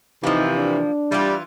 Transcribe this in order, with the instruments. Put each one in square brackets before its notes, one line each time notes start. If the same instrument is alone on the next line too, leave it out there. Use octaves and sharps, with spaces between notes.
[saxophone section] C3 E3 [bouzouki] F3 A#3 [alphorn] D#4
[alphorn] D4
[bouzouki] E3 F4 [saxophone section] G3